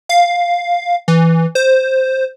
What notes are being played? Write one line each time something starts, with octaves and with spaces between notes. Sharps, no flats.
F5
E3
C5